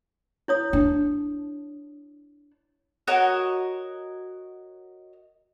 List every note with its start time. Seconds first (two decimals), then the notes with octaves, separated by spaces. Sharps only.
0.48 E4 C#5 D#6
0.73 D4
3.07 F#4 A#4 C#5 D#5